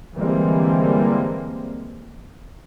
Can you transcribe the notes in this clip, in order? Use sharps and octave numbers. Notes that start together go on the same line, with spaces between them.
D3 E3 G3 G#3 A#3 C4